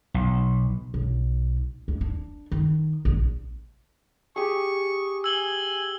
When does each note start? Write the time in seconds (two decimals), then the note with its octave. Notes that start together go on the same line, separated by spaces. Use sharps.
0.14 B1
0.94 B1
1.88 D2
2.01 D4
2.52 D#3
3.05 A#1
4.36 G4 G#4 C#6
5.24 G#5 E6 F#7 G7